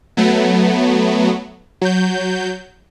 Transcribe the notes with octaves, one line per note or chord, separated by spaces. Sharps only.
F#3 A3 B3
F#3 G6